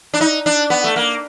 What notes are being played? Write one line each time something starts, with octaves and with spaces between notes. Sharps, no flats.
D4
D#4
D4
B3
A3
A#3